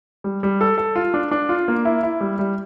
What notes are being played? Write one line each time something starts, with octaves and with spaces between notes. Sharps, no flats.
G3
G3
A4
A4
F4
D4
D4
F4
A#3
E4
E4
G3
G3